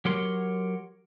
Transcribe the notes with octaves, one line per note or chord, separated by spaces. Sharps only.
F#3 G4 A#4 C#5 C6